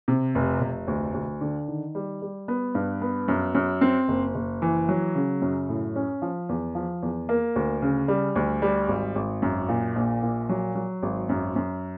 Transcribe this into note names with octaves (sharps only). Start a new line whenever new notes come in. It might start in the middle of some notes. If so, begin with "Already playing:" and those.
C3
F1
F1
D2
D2
D3
D#3
G3
G3
B3
G2
B3
F#2
F#2
C4
F#1
F#1
E3
F#3
C#3
F#2
A2
C#4
F3
E2
F3
E2
A#3
D2
C#3
G3
D2
G3
G#1
G#1
F#2
A#2
A#1
A#2
F#3
F#3
G#1
F#2
F#2